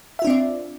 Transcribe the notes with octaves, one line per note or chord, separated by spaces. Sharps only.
C4 D4 F4 D5 E5